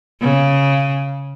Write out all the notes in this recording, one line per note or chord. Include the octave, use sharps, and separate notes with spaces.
C#3